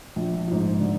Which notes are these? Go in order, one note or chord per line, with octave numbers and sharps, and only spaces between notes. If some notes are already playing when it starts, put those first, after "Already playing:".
A#1
G#2 F3
D3